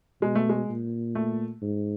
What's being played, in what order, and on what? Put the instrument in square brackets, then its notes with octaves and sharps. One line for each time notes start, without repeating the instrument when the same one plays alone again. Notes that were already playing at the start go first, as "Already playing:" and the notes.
[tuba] B2 [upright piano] G#3
[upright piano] A3
G#3
[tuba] A#2
[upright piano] A3
[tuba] G#2